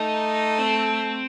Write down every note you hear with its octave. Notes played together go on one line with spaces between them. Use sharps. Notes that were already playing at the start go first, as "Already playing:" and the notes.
Already playing: A3 D#4
C4